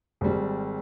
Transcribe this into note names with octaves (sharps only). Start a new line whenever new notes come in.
G#1 G3